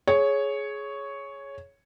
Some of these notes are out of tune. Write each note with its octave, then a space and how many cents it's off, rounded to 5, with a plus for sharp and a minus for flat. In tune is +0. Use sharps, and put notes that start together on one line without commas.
G#4 +15 C#5 +0